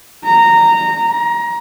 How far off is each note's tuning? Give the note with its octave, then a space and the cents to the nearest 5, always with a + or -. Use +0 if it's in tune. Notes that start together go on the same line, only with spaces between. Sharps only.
A#5 -15
A#5 +20